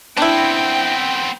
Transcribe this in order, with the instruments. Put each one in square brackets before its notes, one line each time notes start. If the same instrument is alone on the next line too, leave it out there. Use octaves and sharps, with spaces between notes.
[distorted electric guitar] B3 C4 [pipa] D4 E4 [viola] G5